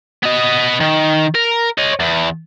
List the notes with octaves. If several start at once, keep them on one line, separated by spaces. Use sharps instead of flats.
B3 D#5
D#3
A#4
C#5 D#5
E2